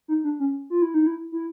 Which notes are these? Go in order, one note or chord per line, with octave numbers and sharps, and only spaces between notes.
D#4
D4
C#4
F4
E4
D#4
E4
E4